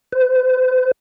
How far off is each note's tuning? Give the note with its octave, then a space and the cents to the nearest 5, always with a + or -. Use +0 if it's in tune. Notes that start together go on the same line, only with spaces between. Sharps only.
C5 -40